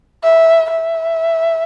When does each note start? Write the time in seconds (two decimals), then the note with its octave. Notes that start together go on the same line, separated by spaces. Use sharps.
0.23 E5
0.70 E5